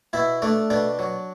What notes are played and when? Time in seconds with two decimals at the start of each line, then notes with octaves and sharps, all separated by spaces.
0.13 B2 E4 E5
0.42 A3 D4 D5
0.70 B2 D4 D5
0.99 F#3